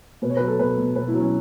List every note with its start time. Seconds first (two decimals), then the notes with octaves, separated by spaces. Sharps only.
0.22 B2 B4
0.30 C#5
0.37 F#3 B4
0.48 A4
0.59 B2 B4
0.78 B2
0.96 B2 B4
1.08 E4
1.14 F#3
1.20 C#4